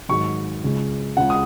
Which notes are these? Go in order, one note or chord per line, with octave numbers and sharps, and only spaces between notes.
G#2 D#3 F#3 C#6
C#2 C#3 G#3
C#2 C#3 G#3 F#5
D#6